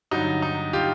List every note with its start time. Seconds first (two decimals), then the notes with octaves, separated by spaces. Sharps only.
0.11 G2 D3 F#3 D#4
0.42 D#4
0.73 F4 G4